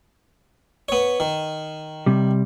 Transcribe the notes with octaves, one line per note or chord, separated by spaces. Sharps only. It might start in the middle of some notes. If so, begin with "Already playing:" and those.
B3 C#5
D#3
C3 G3